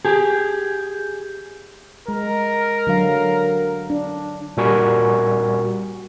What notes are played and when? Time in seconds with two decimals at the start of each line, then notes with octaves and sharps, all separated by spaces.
0.05 G4 G#4
2.08 G#3 A#4
2.87 D3 F#3 F5
3.90 D4
4.57 A#2 G3 F#4 A#4 G#5 C#6